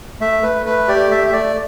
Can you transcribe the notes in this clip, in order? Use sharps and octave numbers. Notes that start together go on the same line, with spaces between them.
A3 E5
A3 B4
A3 B4
G4 D5
A3 E5
E5
A3 D5